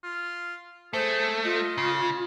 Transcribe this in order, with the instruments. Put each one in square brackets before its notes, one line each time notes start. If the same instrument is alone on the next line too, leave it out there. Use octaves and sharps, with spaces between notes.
[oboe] F4
[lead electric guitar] A3 [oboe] G#4 [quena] C5
[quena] F4 [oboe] D#5
[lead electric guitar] C#3